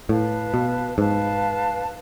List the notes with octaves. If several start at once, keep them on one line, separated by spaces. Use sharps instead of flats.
A2 B4 F5 A5
B2
G#2 B4 F5 A5